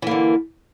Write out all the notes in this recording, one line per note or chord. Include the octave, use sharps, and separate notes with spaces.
D3 E3 A#3